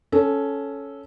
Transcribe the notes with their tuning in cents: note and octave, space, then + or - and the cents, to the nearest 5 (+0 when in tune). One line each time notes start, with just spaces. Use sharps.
C#4 +0 A4 -10